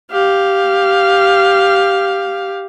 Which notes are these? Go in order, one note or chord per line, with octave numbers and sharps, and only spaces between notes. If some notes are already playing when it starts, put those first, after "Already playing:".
G4 F5